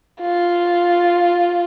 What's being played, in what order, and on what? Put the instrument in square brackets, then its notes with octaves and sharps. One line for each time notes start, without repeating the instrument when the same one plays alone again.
[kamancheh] F4